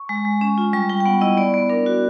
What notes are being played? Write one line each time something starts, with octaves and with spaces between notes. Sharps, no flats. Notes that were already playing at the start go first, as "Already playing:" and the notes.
Already playing: C#6
G#3
G#3
C#4
F4
G3 C#6
G3 G5
G5
B3 F#5
E4 D#5
B3 D5
B3
D4 A#4
F#4